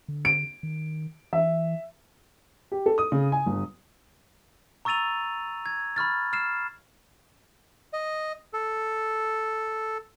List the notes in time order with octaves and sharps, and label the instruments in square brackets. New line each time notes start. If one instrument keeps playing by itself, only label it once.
[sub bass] D3
[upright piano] D7
[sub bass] D#3
[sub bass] E3 [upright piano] E5
[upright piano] G4
A4
D#6
C#3
G#5
G1
[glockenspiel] A#5 C#6 E6 A6 D#7 F7
G#6
B5 C#6 F6 A6
F6 C7 E7
[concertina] D#5
A4